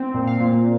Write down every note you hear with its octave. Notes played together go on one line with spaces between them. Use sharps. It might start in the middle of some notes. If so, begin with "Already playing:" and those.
Already playing: C4
A#2
F5
A#2